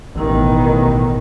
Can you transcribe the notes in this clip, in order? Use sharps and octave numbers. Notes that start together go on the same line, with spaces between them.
A1 B2 D#3